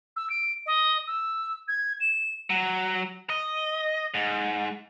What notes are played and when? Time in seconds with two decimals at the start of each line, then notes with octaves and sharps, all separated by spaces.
0.16 E6
0.29 D7
0.66 D#5
1.07 E6
1.68 G#6
2.00 E7
2.50 F#3
3.30 D#5
4.14 G#2